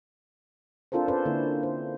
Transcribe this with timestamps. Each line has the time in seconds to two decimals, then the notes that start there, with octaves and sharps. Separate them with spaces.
0.92 C4 D4 F4 A4 A#4 C5
1.08 C#4 A4 B4 C5 D5
1.26 D3 A#3 E4
1.63 C5